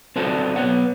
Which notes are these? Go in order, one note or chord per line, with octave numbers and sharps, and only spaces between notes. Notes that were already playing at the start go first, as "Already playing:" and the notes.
C4 F#4 A4 B4 D5 A5
B1 B3 B4 C#5 F#5